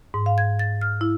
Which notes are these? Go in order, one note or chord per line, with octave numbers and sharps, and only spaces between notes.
G#2
F5
G#6
A6
F6
E4